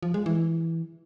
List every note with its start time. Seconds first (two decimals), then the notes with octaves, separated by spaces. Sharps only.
0.03 F3
0.14 G#3
0.26 E3